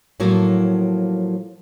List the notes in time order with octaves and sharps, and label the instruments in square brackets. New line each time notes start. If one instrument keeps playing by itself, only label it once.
[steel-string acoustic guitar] A2 F3 F#3 A#3